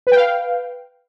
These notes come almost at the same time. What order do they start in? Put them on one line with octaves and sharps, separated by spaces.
B4 G5 F5